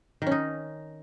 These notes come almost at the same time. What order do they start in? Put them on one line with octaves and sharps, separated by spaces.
D#3 C#4 D#4